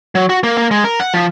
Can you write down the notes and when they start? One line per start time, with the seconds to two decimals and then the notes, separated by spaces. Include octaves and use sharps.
0.15 F#3
0.29 F#4
0.43 A#3
0.58 A#3
0.71 G#3
0.84 A#4
1.00 F#5
1.14 F3